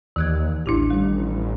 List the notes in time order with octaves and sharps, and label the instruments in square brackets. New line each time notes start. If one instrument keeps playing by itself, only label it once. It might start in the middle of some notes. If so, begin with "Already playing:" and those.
[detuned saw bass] D#2 [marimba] E3 F#6 G#6
[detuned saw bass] A1 [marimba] D4 E4 G4
[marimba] D#3 G3